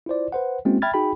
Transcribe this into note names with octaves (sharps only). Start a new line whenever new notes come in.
E4 F4 C5 D5
B4 C5 F#5
G#3 A#3 C4 C#4 E4 F#4
E5 G5 B5 F6 G#6 A6
D#4 F#4 G#4 G5 B5